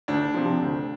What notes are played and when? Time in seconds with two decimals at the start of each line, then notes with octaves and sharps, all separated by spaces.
0.08 D2 D4
0.34 C3 F3
0.62 D2